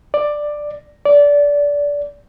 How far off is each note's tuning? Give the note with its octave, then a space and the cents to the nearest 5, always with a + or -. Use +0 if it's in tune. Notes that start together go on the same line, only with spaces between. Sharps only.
D5 +10
D5 -20